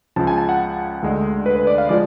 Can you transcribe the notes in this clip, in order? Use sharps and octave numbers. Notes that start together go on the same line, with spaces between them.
C#2 C#3 F3 A5
G#5
A5
F#5
D2 D3 G#3
B4
B4
D5
F5
F3 G#3 D5